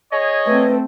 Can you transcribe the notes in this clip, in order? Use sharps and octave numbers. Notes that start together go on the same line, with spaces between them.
G#4 C#5 D#5
A3 C4 B4